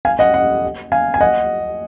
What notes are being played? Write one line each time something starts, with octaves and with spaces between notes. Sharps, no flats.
F5 G#5
D#5 F#5
D#5 F#5
F5 G#5
G#5
D#5 F#5